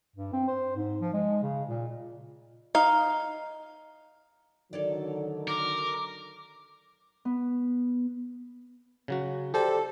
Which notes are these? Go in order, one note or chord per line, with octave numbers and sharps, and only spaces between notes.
G2
C4
C5
G#2
F3
G#3
C#3
A#2
D#4 F5
D3 D#3 F#3 A4 C#5 D5
A#4 D6
B3
C#3 F#3 F#4
G4 A4 C5 D5